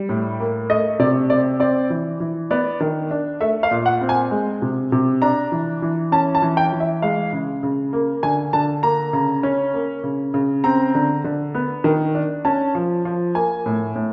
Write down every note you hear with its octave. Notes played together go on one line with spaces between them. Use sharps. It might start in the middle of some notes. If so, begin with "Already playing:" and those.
Already playing: G3
A2
A#3
A3 D#5
C3 D5
C4 D5
C4 D5
E3
E3
B3 D5
D#3
D4
A3 E5
F5
A#2
F#5
C4
G#5
G#3
C3
C3
D4 A#5
E3
E3
C#4 A5
A5
E3
G5
E3
E5
G#3 F5
C#3
C#3
A#3
D3 G#5
D3 A5
A#3 A#5
C#3
C#4
A#3
C#3
C#3
C4 A#5
D3
D3
B3
D#3
D4
C#4 A5
F3
F3
A#3 G#5
A2
A2